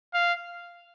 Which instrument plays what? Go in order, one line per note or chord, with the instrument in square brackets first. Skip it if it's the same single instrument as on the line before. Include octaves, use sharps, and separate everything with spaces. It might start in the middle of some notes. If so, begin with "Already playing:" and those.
[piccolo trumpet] F5